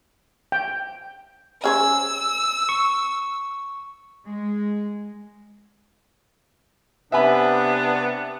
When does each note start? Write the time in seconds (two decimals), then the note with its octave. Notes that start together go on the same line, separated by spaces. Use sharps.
0.52 G5
1.64 C#4 G#4 C5 E6
2.69 C#6
4.25 G#3
7.12 C3 B3 D4 E5 G#5 B5